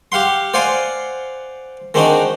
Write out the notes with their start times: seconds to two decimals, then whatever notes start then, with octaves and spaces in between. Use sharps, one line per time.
0.12 G4 F5 F#5 C6
0.54 C5 D5 F5 F#5 G#5 C6
1.94 D#3 G#3 C4 D4 D#4 F#4